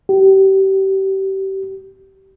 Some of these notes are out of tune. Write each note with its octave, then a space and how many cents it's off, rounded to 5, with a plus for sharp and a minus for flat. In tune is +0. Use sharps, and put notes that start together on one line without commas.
G4 -30